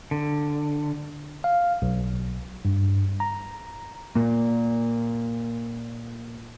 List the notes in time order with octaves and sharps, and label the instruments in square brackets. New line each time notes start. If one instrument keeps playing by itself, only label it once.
[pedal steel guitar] D3
[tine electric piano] F5
B1
G2
A#5
[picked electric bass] A#2 A#3